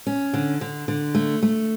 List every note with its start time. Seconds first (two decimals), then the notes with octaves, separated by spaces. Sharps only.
0.07 C#4
0.34 D3
0.61 D3
0.88 D3
1.15 A3
1.43 A3